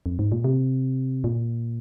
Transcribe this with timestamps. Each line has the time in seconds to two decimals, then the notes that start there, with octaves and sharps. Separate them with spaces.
0.06 F2
0.19 G#2
0.32 A#2
0.44 C3
1.24 A#2